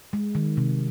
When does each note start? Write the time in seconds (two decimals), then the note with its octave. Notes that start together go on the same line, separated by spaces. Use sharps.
0.13 G#3
0.35 D#3
0.57 C3